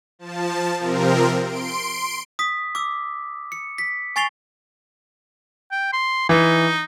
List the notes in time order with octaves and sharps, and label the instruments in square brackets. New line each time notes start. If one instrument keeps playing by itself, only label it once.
[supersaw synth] F3 A5
C3 F3 C4 A#4
C6 D7
[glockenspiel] D#6 B6
D6 E6
C#7
B6
G#5 C#6 A6 C7 F7 G7
[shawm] G5
C6
[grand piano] E3 [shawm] D#4